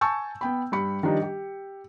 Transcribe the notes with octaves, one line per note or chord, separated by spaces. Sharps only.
G#5 A5 C#6 E6 G6
B3 G5 B5
G2 G4 B5 C#7
D#3 F3 G3 D4 D#4
G4